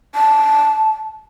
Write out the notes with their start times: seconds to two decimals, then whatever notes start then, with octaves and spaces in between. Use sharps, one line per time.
0.15 A5